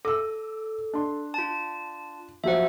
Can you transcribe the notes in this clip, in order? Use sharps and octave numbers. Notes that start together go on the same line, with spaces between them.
A4 D6 E6
D4 C6
F4 A5
F3 F#3 C5 E5 F#5